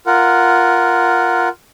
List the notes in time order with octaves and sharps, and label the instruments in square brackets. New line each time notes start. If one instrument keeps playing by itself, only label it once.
[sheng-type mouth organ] F4 A#4 F#5